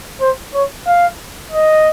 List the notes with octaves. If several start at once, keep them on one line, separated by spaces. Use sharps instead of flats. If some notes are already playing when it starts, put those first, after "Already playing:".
C5
C#5
F5
D#5